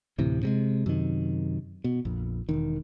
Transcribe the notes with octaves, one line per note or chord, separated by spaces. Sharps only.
D2 A2 C3 E3
C3 G3 G#3
F#2 C3 D#3
B2
A#1 F2
E1 D#3